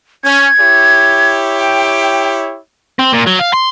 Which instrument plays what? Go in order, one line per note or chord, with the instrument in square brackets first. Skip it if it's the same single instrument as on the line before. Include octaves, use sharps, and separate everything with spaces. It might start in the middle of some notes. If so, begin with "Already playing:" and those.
[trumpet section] C#4 [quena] G#6
[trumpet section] E4 G4 C#5
[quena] G5
[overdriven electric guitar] C4
A#2
F#3
F5
C6